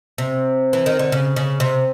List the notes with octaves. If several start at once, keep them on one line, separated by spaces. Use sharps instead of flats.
C3
E3
D#3
D3
C#3
C#3
C3